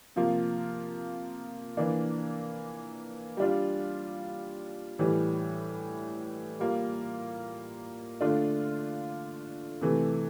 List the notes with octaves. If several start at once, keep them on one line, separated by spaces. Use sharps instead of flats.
C3 F3 A#3 F4
E3 A#3 D4
G3 D4 F4
A2 E3 G3
G3 A#3 F4
D3 A3 D4 F4
C3 E3 A3